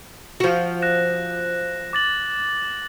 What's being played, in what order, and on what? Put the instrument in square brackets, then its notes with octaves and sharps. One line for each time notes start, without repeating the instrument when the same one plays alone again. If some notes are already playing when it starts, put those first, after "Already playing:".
[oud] F3 F#4
[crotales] F#6 A#6 E7
D6 A6 F#7